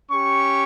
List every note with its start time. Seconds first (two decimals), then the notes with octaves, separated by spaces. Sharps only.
0.11 C#4 G4 C#6